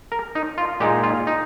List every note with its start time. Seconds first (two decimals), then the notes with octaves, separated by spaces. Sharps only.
0.12 A#4
0.35 D#4
0.58 F4
0.80 A#2 G#3 D#4 G4
1.03 F4
1.27 D#4